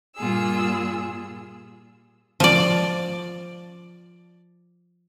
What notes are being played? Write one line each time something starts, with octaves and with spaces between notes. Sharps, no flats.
G2 A#2 G3 F4 G#4 E6
F3 D5